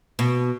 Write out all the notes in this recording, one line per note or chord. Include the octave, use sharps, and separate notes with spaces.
B2